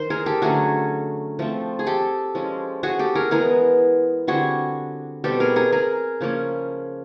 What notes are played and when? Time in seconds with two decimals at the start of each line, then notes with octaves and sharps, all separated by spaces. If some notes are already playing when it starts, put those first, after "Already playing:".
Already playing: D#3 C5
0.10 G#4 A#4
0.26 G4 A4
0.42 D3 F#3 A3 C#4 F#4 G#4
1.39 F3 A3 C4
1.79 G#4
1.87 G4 A4
2.35 F3 G#3 C#4
2.83 F#4 G#4
2.99 G4 A4
3.15 G#4 A#4
3.31 E3 G#3 B3 G#4 A#4
4.27 D3 G3 C4 F#4 G#4
5.24 B2 G3 C4 G4 A4
5.40 G#4 A#4
5.56 G#4 A#4
5.72 G#4 A#4
6.21 C#3 F3 A#3 C#4